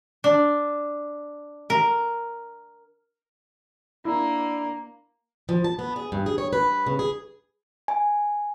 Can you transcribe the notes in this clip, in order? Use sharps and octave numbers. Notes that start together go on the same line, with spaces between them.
D4
A#4
A#3 D4 E4
F3
A5
B3
G#4
G2
G#4
C#5
B4
C#3
G#4
G#5